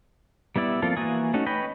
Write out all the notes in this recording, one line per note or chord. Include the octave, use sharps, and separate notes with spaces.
G3 B3 E4 D5 E6
F3 A#3 C4 F4 A4
E3 A#3 F#4 G#5 D#6
A3 C#4 D#4 F#4
B4 C#5 D#5 G5 B5